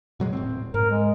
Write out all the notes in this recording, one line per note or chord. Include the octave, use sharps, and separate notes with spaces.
B2 F#3 G#3
D#1 A2 C4
G#2 A#4
G#3